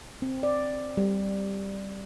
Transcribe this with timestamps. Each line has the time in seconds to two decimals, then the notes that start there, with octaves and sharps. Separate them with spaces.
0.22 C4
0.43 D5
0.97 G3